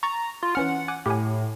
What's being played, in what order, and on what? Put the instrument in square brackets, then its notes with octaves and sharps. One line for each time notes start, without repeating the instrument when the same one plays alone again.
[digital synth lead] A#5 [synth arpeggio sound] C#6 A6
[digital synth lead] F4
[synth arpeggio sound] E3 C#4 F6 [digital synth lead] F#5
[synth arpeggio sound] G#5 D6 F#6
[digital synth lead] A2 [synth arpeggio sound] G4 G#5